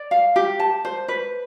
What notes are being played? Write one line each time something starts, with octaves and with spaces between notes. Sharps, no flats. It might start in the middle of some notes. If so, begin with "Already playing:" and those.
Already playing: D5
F5
G4
A5
C5
B4